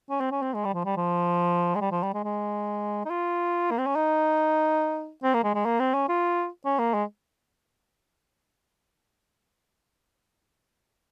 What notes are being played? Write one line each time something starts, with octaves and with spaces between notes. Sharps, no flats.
C#4
C4
C#4
C4
G#3
G3
F3
G3
F3
G#3
G3
F3
G3
G#3
G#3
D#4
F4
A#3
C4
C#4
D#4
C4
A#3
G#3
G#3
A#3
C4
C#4
F4
C#4
A#3
G#3